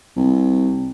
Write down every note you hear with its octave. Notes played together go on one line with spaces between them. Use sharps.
C2